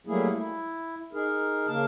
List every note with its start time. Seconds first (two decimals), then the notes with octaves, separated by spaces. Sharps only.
0.07 F#3 G3 A3 A#3 E4 G#4
0.36 E4
1.13 D#4 G#4 A#4
1.67 C#3 A#3 A#4 A5